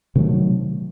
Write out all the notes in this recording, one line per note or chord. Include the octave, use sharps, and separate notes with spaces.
C3 D#3 F#3 A3